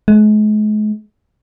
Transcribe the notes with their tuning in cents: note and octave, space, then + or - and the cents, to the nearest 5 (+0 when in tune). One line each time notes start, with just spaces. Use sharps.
G#3 +40